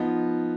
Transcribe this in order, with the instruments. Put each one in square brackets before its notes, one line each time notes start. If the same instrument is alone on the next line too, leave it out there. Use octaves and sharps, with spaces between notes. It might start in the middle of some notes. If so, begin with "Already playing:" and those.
Already playing: [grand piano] F3 B3 D#4